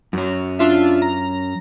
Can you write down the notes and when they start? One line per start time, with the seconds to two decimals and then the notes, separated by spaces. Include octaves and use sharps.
0.13 F#2 C#4
0.59 D4 F4 E5
1.02 A#5